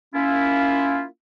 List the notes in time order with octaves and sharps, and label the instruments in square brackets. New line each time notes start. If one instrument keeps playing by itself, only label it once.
[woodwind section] A#3 C#4 E4 F4